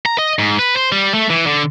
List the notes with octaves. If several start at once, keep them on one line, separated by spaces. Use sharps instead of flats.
A#5
D#5
G#2
B4
C5
G3
A3
E3
D3